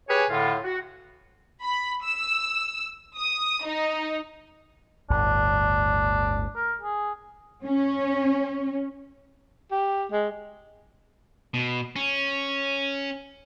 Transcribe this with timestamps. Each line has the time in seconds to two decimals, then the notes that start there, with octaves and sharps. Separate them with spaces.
0.08 G4 G#4 B4 C#5 G#5
0.29 A2 D3 F4
0.64 F#4
1.63 B5
2.04 E6
3.17 D#6
3.66 D#4
5.10 G1 D2 A2 D4
6.56 A#4
6.81 G#4
7.64 C#4
9.71 G4
10.12 G#3
11.54 B2
11.96 C#4